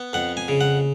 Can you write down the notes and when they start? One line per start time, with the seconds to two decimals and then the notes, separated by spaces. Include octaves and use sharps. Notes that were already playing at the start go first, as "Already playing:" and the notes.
Already playing: B3
0.13 F2 F#5
0.37 G#5
0.48 C#3
0.61 F#5